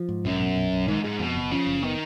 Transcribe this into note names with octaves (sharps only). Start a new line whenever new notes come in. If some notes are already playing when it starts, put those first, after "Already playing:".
Already playing: F3
G#2
B1 F#2
B2
B1
B1
G#2 D#3
G#2 G#3
F2 B2
F#1
C#3 F3
F#1
D#3 B3